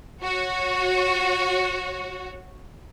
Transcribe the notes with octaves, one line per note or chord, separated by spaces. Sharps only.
F#4 C#5